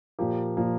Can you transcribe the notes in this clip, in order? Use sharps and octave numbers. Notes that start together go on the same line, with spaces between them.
A#2 F3 A#3 G4
A#2 F3 A#3